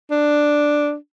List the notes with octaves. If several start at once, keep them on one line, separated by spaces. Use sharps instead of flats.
D4